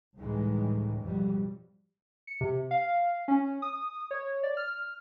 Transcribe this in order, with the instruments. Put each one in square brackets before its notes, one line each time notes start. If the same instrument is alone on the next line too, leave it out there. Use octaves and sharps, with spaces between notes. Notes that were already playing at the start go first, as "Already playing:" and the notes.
[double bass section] C#2 A2 D#3 E3 G3 G#3
A1 F2 B2 F#3 G3
[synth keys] C#7
C3
F5
C#4
D#6
C#5
D5
F6